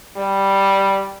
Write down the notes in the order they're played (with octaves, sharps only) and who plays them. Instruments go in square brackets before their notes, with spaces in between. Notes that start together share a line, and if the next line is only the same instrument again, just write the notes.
[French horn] G3